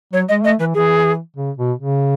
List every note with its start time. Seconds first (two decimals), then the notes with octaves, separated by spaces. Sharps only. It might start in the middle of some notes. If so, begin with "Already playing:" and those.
0.13 F#3 C#5
0.29 G#3 D#5
0.44 A3 D#5
0.60 E3 B4
0.74 E3 G#4
1.36 C#3
1.57 B2
1.78 C#3